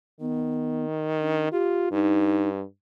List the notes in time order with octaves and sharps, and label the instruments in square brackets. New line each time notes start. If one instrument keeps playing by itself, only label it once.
[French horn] D#3 [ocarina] B3
[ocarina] D4
[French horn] F4 [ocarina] G4
[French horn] G2 [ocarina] D#4